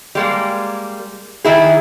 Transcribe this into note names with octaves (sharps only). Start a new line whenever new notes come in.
G3 G#3 A#3
D#3 E4 G#4